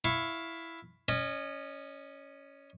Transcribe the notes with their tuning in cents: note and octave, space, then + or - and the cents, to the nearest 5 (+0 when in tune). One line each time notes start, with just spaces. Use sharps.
E4 +5 F5 +15 C#6 -10
C#4 +5 D#5 -30